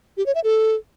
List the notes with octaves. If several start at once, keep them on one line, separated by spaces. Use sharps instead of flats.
G4
C#5
E5
A4